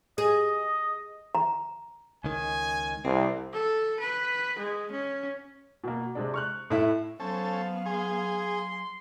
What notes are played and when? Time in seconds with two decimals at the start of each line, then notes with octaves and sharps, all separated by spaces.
0.18 G#4 D#5
1.35 A#5
2.24 C#2 D#3 G#5
3.05 C2 C4
3.53 A4
4.00 B4
4.59 G#3
4.92 C#4
5.84 B2 A#3
6.15 C3 G#3 D4
6.34 C#6 F6 F#6
6.70 A2 E4 E5
7.20 F#3 B3 C#4 A4 C5 F5
7.86 G#4 C6